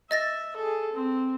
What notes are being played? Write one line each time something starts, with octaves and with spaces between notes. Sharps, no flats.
D#5 E5 A6 A#6
G#4 A4
C4